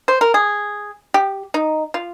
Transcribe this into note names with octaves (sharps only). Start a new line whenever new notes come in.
C5
A#4
G#4
G4
D#4
F4